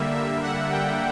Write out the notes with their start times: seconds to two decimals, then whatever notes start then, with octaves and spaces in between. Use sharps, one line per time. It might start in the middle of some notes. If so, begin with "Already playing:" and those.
Already playing: D3 G3 A#3 E5
0.14 E5
0.43 F#5
0.72 G5